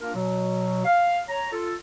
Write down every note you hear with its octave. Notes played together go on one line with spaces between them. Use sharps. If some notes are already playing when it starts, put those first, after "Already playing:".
A#3 D4 F4 A#4
B2 F#3
F5
C#5 A#5
F4 A4